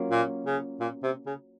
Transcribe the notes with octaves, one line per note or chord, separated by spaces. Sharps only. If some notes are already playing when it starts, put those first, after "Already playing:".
Already playing: F#3 A#3 C#4 F4
A#2
C#3
A#2
C3
C#3